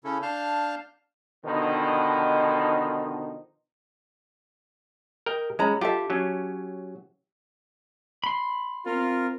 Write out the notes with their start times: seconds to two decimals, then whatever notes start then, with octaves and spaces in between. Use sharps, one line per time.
0.04 C#3 C#4 E4 A4
0.22 D4 F5 A5 F6 G6
1.44 B2 D3 D#3 F3 D#4
5.26 A#4 D#5 G5
5.59 G#3 C#4 A#5 B5
5.81 F4 G4 A4 E5
6.10 F#3 C#4
8.24 B5 C6
8.86 C4 F4 A#4